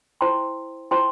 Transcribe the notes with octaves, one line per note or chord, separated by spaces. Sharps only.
E4 C5 G5 C6
E4 C5 G5 C6